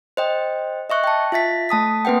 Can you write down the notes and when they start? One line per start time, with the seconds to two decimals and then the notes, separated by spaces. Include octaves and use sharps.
0.17 C5 D#5 G5
0.90 D#5 E5 C#6 F#6
1.04 G5 A5
1.32 F4 E5 A6 B6
1.69 A3 A5 D#6 B6
2.05 A#3 C4 B4 F#5 G5